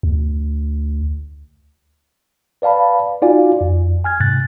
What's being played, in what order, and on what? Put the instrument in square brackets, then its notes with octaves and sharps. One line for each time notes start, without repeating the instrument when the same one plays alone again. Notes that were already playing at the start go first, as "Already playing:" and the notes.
[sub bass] D2
[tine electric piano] B4 D5 F5 A5 B5
D#4 F4 F#4 D5 F5 G#5
F2
G#5 F6 G#6
G#2 C3 F#6 A6